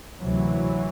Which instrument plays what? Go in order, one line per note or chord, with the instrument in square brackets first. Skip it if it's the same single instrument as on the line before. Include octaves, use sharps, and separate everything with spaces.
[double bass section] D2 C3 E3 F#3